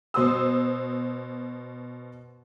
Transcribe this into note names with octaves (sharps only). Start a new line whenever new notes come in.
B2 C5 D#6 E6